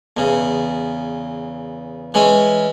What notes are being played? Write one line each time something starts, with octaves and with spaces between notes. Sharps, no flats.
E2 C#3
E3 G#3 C#4